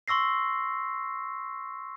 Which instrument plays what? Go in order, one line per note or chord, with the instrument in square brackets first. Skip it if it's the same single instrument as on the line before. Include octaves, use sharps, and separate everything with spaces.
[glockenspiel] C6 C#6 E6 A#6 C7